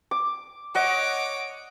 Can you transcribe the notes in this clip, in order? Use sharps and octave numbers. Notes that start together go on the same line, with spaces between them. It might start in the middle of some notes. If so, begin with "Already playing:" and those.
D6
C#5 D#5 F#5 D6